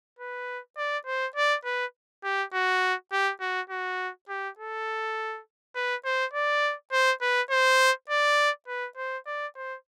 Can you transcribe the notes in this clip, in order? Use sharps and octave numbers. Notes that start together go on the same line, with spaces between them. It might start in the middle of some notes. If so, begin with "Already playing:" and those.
B4
D5
C5
D5
B4
G4
F#4
G4
F#4
F#4
G4
A4
B4
C5
D5
C5
B4
C5
D5
B4
C5
D5
C5